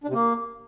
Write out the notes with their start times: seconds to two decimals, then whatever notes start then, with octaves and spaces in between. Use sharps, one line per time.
0.04 D4
0.09 C3
0.14 A#3